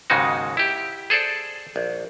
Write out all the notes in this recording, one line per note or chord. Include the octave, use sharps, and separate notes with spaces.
D#2 G#2 C#3 G#3 D#4 F#4
E4 G4
G#4 A4 C5 D5
A#1